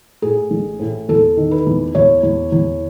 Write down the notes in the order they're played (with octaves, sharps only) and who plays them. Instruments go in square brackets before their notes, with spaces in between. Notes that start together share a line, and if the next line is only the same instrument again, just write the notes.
[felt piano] A2 G#4
A1
A2
E2 A4
D#3
B4
E2
E2 C#5
E2
E2